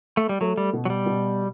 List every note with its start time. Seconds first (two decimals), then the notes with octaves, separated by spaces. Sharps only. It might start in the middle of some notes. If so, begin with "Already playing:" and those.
0.17 A3
0.29 G3
0.41 F#3 A3
0.58 G3
0.73 B2
0.85 F#3
0.90 G3
1.06 B2